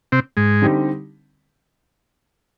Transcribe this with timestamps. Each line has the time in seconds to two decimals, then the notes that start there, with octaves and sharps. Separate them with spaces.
0.12 C3 C4
0.37 G#2 G#3
0.62 D3 G3 C4 D#4 G4